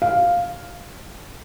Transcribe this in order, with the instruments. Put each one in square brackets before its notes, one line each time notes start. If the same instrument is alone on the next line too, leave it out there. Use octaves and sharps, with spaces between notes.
[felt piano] F5